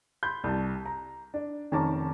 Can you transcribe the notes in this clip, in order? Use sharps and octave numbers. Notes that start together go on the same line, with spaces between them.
B5 C6 G6
C2 A5
A#5
D4
F1 D#3 C#4 A5 A#5 D6